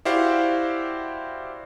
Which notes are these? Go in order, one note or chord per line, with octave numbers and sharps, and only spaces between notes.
E4 F#4 G4 C5 D5 F5